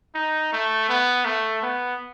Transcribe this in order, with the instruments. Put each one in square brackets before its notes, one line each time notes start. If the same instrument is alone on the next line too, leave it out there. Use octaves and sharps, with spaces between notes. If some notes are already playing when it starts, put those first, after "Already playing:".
[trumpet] D#4
A3
B3
A3
B3